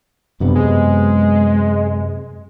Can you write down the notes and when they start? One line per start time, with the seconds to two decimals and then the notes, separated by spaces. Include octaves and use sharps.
0.40 G1 F#2 C3 B3
0.55 G#3